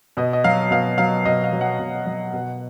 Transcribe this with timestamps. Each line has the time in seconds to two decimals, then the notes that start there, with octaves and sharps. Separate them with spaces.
0.17 B2 D#5
0.33 D#5
0.44 F#3 F5
0.71 B2 F5
0.98 F#3 F5
1.25 B2 D#5
1.44 F5
1.52 F#3
1.61 F#5
1.79 B2
2.06 F#3
2.33 B2